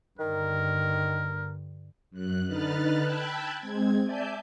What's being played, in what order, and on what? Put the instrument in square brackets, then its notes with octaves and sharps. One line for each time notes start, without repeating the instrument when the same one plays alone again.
[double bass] G2 D3 [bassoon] D#3 [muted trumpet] A#4
[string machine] F#2 F#6
D3 D#4 B4 F6 F#6 A6
G5 A5 B5 E6 F#6 G#6
G#3 C4 G#6
D5 E5 G#5 A5 G6